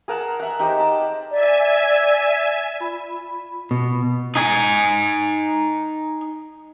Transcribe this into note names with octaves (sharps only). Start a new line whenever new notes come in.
G#4 A#4 F#5 A5
E5 F#5
D#4 G4 C5
A5
D5 E5 G#5
F4 B5
B2
D#4 G#5